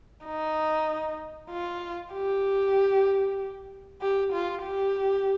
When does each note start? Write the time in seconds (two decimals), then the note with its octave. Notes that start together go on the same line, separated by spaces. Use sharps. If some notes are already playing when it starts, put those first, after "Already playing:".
0.25 D#4
1.50 F4
2.13 G4
4.01 G4
4.33 F4
4.64 G4